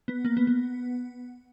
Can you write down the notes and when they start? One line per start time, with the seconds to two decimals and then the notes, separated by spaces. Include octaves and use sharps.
0.08 B3
0.25 A#3
0.37 B3
0.47 B3